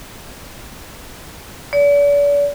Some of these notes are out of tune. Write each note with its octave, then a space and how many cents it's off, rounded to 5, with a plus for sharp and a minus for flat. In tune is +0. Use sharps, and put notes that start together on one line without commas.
D5 -40